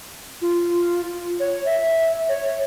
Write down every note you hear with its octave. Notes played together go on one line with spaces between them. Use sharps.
F4
C#5
E5
C#5